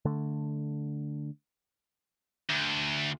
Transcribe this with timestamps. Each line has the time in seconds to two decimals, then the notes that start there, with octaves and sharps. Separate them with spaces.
0.05 D3 A3
2.50 D2